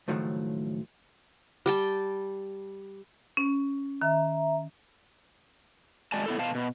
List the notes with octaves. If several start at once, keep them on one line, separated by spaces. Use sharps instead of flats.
C#2 A2 D#3 F3 F#3 A3
G3 G5 A5
C#4
D#3 E5 A#5
G#3 F#4 D5 G#5 A5
B3 E4 A4
B2 F5 A5
B2